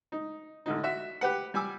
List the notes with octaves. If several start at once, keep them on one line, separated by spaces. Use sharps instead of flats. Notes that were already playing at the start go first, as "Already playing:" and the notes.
D#4
A1 D3 D#4
F#4 E5
G4 B4 F#5
G3 G#5 D6 E6